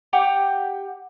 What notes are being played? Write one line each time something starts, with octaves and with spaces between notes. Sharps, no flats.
G4 F#5 G5 D6